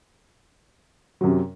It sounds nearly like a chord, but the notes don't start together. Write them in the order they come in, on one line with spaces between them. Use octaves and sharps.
F#3 F#2 C3